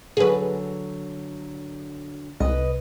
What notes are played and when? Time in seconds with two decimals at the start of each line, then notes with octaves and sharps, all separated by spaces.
0.17 D3 F#3 G#4 B4
2.40 C2 B4 D#5